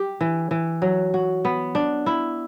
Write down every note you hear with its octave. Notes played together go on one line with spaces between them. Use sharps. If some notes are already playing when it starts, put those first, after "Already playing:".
Already playing: G4
E3
E3
F#3
F#4
B3
D4
E4